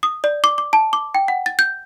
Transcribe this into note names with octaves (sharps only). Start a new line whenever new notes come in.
D#6
D5
D6
D6
A5
D6
G5
F#5
A6
G6